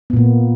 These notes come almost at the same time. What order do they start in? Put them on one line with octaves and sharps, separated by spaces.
B3 A#2 A#3